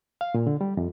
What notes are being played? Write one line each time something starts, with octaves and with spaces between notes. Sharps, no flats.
F5
A#2
D3
G3
F2